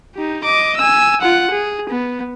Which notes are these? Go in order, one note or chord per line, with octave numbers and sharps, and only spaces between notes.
D#4 G4
D#5 D6
G#5 E6
F4 F#5
G#4
B3